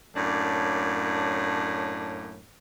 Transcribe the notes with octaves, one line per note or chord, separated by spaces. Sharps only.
F#2 A2 A#3 D4